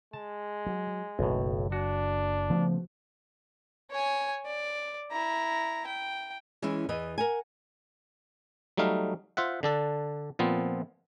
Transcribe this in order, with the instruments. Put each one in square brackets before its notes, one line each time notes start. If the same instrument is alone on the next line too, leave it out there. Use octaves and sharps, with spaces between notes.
[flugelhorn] G#3 [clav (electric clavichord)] A5
[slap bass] F#3
[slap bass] F#1 [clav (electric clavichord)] B1 A2
[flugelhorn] D4 [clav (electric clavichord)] F#4
[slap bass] C#3 A3 B3 [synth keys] F3
[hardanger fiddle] C#5 G#5
D5
E4 A#5
G5
[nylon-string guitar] E3 G#3 C#4 E4
E2 E3 B4 D#5
A#4 F#5 G#5
[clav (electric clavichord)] F#3 G3 A3 D#4 F5
F4 C5 E5 F#5
D3 D4 A4
A#2 F3 B3 C4